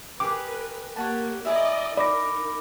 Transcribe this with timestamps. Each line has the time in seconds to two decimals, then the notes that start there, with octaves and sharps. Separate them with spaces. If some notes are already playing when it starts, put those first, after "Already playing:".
0.20 G4 G#4 A#4 B4 D6
0.96 A#3 G4 C#5 F#5 A5
1.45 E4 G#4 D5 D#5 A#5
1.97 D#4 A#4 D5 B5 D6 A#6